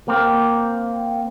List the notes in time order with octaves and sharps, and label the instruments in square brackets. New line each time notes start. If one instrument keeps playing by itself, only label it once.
[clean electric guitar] A#3 C4